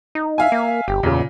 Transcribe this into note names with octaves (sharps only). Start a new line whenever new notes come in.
D#4
E5 F5 G#5
A#3
G1 G4
E2 A#2 C#3